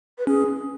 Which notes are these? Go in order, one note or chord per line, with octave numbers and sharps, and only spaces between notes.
B4
C#4 G#4